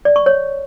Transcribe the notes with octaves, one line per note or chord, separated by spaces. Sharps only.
D5
C#6
C#5